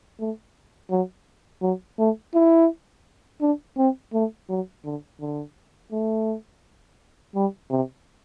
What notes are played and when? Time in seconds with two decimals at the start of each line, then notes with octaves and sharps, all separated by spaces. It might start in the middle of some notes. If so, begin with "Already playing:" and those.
0.20 A3
0.91 F#3
1.62 F#3
1.99 A3
2.34 E4
3.41 D4
3.77 C4
4.13 A3
4.49 F#3
4.84 D3
5.20 D3
5.92 A3
7.35 G3
7.70 C3